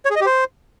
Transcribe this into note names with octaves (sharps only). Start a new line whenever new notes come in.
C#5
G#4
D#5
G4
C5